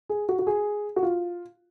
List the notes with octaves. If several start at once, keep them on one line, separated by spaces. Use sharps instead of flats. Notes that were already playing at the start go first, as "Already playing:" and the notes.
G#4
F#4
F#4
G#4
F#4
F4